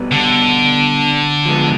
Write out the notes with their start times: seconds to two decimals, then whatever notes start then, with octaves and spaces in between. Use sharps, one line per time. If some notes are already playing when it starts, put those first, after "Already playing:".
Already playing: B2 G3 B3
0.11 D3
1.46 F3 G#3 B3